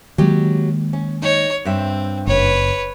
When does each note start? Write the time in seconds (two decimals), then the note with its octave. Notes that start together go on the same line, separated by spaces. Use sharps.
0.18 D#3 F#3 G#3 A#3 G4
0.93 C#4
1.22 D#4 C#5
1.65 G2 C4 E5
2.27 F#1 B4 C#5